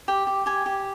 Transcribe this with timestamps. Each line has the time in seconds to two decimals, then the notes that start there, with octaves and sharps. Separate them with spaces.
0.08 G4 G5
0.27 G4
0.46 G4 G#5
0.66 G4